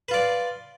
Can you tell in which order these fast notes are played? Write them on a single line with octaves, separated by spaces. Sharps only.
B4 F4 D5